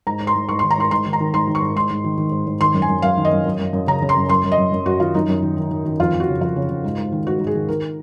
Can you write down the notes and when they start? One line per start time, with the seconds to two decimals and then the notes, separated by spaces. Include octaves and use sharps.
0.07 G#2 A#5
0.20 G#2
0.27 C6
0.35 G#2
0.49 G#2 C#6
0.59 D#3 C6
0.71 A#5
0.78 G#2 C6
0.91 G#2 C6
1.06 D#3
1.13 A#5
1.20 D#3
1.34 G#2 C6
1.47 D#3
1.55 C#6
1.62 G#2
1.76 G#2 C6
1.90 G#2
2.04 D#3
2.18 D#3
2.32 G#2
2.47 G#2
2.61 D#3 C6
2.74 F#2
2.82 G#5
2.88 F#2
3.02 F#2 F5
3.17 D#3
3.25 D#5
3.31 F#2
3.45 F#2
3.59 F#2
3.73 F#2
3.87 C#3 A#5
4.02 C#3
4.09 C6
4.16 F#2
4.29 F#2 C6
4.44 F#2
4.52 D#5
4.58 F#2
4.72 F#2
4.86 F#2 F#4
5.00 D#3 F4
5.14 F#2 D#4
5.28 F#2
5.42 D#3
5.57 D#3
5.70 D#3
5.85 D#3
6.00 F2 F4
6.13 F2
6.20 F#4
6.28 C#3
6.41 F2 F4
6.56 C#3
6.69 C#3
6.84 G#2
6.98 G#2
7.12 D#3
7.26 G#2 F#4
7.40 G#2
7.47 G#4
7.55 D#3
7.69 D#3 A#4